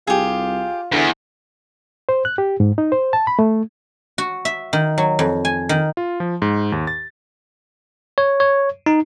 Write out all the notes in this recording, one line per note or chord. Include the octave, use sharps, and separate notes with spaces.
C2 F4 G4 G#4
E2 D3
C5
F#6
G4
G#2
D#4
C5
A5
B5
A3
F#4
E5
D#3
F#3
F2
G#5
D#3
F4
F3
G#2
D#2
A6
C#5
C#5
D#4